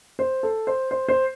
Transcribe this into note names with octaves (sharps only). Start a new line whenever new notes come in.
C5
A4
C5
C5
C5